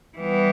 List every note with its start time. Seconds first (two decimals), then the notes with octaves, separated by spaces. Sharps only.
0.18 E3 G3 B3